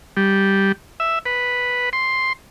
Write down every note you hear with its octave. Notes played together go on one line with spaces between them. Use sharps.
G3
E5
B4
C6